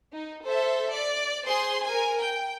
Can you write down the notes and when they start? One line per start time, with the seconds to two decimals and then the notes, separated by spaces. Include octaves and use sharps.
0.12 D#4
0.45 A4 C5 E5
0.93 D5
1.45 G#4 C5 C6
1.84 A#4 G#5
2.21 G5